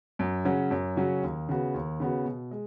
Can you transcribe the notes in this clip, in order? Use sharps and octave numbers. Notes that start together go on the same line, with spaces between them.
F#2
C#3 F#3 C#4 F#4
F#2
C#3 F#3 C#4 F#4
D#2
C#3 B3 F#4
D#2
C#3 B3 F#4
B2
G#3